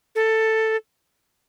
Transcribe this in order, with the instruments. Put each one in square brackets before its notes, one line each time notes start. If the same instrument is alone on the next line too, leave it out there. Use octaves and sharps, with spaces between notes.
[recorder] A4